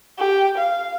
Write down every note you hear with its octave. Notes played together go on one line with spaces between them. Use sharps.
G4
F5